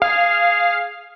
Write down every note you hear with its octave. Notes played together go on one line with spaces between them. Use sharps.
G#4 F5